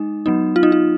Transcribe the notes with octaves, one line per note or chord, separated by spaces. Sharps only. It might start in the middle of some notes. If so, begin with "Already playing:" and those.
Already playing: G#3 D#4
F#3 B3 D#4
F4
D#4
F4